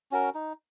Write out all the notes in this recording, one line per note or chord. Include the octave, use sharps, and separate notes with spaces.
C#4 F#4 A#4
D#4